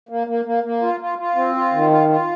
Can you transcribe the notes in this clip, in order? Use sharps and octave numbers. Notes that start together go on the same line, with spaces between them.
A#3
A#3
A#3
A#3
F4
F4
F4
C4
F4
D#3
F4
F4